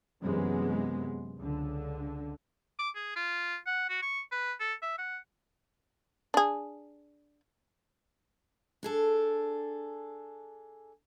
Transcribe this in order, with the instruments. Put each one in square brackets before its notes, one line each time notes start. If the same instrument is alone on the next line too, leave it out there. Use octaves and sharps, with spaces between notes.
[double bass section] F#2 C3 E3 G#3 B3
C#2 D3
[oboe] D6
G#4
F4
F#5
F#4
C#6
B4
A4
E5
F#5
[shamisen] D4 G#4
[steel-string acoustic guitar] D4 G#4 A4